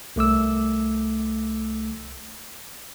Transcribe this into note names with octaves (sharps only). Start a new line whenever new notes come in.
C2 A3 D6 E6